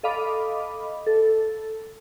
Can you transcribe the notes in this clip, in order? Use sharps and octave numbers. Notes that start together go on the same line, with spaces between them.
A4 D#5 F5 B5 D6
A4